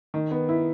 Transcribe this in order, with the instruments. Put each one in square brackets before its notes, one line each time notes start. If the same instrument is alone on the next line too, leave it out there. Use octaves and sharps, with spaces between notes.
[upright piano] D#3
B3
E4